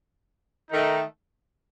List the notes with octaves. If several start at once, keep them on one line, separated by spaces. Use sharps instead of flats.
D#3 A3 D#4